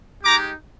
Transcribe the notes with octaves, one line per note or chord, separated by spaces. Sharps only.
G#3 D#4 G4 A#5 D6